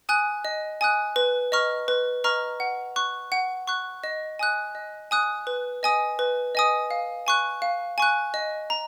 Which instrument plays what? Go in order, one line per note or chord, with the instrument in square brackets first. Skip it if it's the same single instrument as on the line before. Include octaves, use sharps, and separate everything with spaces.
[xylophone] G#5 D#6 F#6
D#5
G#5 D#6 F#6
B4
D#5 A#5 C#6 F6
B4
D#5 A#5 C#6 F6
F#5
C#6 F#6
F#5
C#6 F#6
D#5
G#5 D#6 F#6
D#5
G#5 D#6 F#6
B4
D#5 G#5 D#6
B4
D#5 G#5 D#6
F5
G#5 C#6 F#6
F5
G#5 C#6 F#6
D#5
A#5